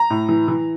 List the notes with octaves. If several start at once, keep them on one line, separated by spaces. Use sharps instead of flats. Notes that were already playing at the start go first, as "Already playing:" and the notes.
Already playing: A#5
A2
E3
E3